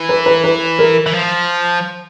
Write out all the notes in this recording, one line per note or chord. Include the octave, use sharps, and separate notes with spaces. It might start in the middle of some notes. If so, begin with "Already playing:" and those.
Already playing: E3
B4
B4
B4
A#4
E3
F3